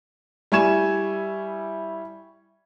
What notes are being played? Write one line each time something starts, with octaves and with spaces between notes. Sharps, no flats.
G3 E4 G#5 C#6 G#6 E7